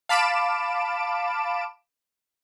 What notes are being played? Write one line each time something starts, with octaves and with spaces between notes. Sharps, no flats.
F5 A5 B5 D6 D7 E7